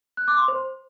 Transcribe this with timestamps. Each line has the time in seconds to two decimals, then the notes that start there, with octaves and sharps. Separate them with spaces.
0.17 F#6
0.28 D6
0.38 C6
0.48 C5